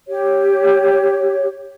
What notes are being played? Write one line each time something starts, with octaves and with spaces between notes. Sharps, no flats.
G4 C#5